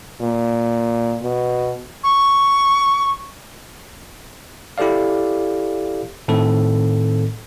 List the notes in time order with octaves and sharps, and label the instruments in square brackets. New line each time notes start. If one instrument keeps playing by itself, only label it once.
[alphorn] A#2
B2
[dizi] C#6
[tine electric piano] E4 G4 A4 D5 F5
A2 D#3 C4 A4